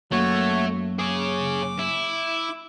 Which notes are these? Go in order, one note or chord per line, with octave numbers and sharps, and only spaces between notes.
F#2 A3 A#3 F#4 C#5
G#4 C#5 D6
E4